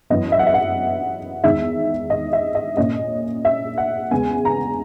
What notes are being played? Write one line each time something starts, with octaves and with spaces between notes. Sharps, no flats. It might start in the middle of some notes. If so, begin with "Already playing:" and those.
F#2 E3 B3 D#5
E5
F#5
E5
F#5
E2 D#3 G#3 D#4 E5
D#5
E5
D#5
A#2 A#3 C#4 D#5
E5
F#5
E2 C#3 G#3 B3 G#5
A#5